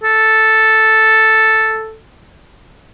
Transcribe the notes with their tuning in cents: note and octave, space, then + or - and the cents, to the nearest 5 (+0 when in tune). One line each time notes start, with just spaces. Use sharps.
A4 +0